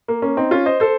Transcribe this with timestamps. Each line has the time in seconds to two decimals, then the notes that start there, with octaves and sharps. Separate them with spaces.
0.08 A#3
0.22 A#3 C#4
0.37 C4 D#4
0.51 C#4 F4
0.66 C5 D#5
0.80 A4 C5